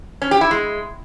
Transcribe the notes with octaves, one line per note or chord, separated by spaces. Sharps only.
C#4
G4
E4
G#3